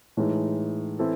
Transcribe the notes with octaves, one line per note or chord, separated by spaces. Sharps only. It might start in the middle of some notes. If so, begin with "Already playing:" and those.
A2 E3 G#3 D#4
E3 C4 E4 A4